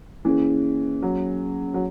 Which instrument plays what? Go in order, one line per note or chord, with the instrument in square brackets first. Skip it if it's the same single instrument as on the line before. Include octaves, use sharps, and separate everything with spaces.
[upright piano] E3 [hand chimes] A#3 C#4 G#4
[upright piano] F#3
F#3